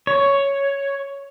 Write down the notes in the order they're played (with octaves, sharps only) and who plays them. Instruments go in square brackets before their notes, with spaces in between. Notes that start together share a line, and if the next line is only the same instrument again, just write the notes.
[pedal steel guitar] C#5